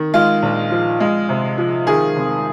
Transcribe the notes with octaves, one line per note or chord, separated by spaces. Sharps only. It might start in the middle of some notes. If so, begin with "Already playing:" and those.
Already playing: D#3
G#3 F4
A#1
F3
G#3
C3
F3
D#3 G#4
F1